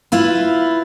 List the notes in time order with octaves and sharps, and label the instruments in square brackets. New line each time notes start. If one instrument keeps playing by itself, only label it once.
[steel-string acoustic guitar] E4 F4 B4